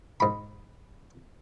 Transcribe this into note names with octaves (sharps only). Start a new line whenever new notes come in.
G#2 B5